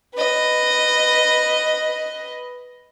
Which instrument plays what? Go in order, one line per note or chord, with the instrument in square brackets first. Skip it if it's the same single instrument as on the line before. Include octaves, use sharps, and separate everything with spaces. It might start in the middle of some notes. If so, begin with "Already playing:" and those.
[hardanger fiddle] B4 D#5